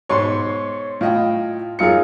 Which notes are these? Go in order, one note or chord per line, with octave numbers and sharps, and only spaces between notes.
G#2 B2 C#5 C6 C#6
A2 F4 D#5 G5
F#2 D#4 F4 G#4 C#7